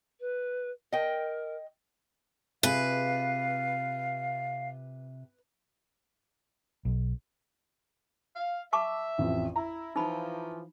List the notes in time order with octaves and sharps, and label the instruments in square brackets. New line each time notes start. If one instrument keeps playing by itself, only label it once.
[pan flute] B4
[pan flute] A#4 [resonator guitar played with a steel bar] D#5 G5
[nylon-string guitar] C3 F4 G#4 [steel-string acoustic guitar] B4 [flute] F5
[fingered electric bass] B1
[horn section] F5
[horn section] E5 [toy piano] A5 C#6 D6
[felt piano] A1 F2
[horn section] E4 [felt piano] A#5
[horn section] E3 F3 [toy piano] D#4 B5